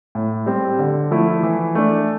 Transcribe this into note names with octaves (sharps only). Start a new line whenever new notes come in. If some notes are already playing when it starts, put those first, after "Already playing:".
A2
G3 C4
D3
F3 A3 E4
E3
A3 D4